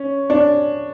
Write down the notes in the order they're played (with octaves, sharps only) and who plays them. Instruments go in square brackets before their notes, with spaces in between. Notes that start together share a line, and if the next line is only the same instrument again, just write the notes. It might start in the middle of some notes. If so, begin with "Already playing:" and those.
Already playing: [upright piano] C#4
D4